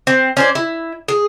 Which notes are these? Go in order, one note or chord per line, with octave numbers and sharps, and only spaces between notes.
C4
C#4 C5 D5
E4
G#4